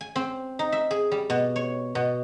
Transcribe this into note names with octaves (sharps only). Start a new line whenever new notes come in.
G#5
C4
D#4
E5
G#4
G3
B2
C#5
B2